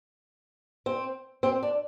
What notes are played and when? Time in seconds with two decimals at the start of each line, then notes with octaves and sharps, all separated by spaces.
0.86 C4
1.43 C4
1.63 D4